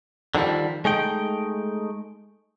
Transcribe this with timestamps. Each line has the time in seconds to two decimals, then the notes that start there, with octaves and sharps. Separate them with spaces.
0.35 D3 D#3 F3 G3
0.85 G#3 A3 D#4 G5